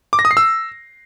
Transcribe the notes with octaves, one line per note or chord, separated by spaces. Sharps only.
D6
A#6
D#6
C7
E6